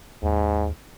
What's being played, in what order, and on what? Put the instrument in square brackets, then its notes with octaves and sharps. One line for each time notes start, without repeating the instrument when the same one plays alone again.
[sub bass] D#2 [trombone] G#2